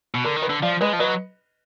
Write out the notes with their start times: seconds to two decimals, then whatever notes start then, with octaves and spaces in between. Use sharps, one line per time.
0.14 B2
0.24 D3 A#4
0.36 D#3
0.42 B4
0.49 D3
0.62 F3 D5 F5
0.81 G#3 B4 D#5
0.93 F3
0.99 F#3 B4 D#5